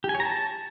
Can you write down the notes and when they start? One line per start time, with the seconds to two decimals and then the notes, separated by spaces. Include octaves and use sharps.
0.04 G4
0.09 G#5
0.15 C#5
0.20 A#5
0.25 A5